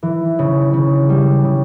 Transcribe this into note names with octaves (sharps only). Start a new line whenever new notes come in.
E3
C#3
C#3
G3
C#3